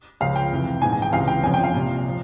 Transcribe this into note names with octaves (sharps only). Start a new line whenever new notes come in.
C#2 C#3 F3 F5
G5
F1 F2 E3
A#1 G#2 E3 G#5
G#5
G5
C#2 C3 E3 F5
G5
G1 F2 C#3 F3 G#5
G5
F5
C2 A#2 F3
F3